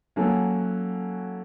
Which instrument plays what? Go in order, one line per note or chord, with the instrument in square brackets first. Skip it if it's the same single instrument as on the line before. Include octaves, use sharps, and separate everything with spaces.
[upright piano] F#3 A#3 C#4 F#4 A4